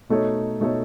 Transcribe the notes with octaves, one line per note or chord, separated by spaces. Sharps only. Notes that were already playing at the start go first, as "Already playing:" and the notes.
B2 A3 D#4 A4 C#5
B2 A3 D#4 A4 C#5